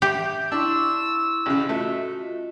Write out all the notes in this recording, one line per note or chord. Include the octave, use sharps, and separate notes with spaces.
G4 E5
D4 E4 C6 C#6 E6
A1 C#3
A3 F4 F#4 D#5